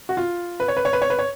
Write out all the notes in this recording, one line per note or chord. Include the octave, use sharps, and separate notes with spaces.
F#4
F4
B4
C#5
B4
C#5
B4
C#5
B4
C#5